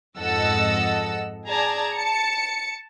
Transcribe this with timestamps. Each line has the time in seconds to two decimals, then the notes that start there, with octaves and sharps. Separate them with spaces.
0.17 F2 G#2 A4 D#5 F#5 E6
1.45 G#4 D5 A5 A#5 G#6
1.94 A5 C#7